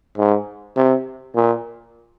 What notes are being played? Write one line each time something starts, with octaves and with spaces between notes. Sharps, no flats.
G#2
C3
A#2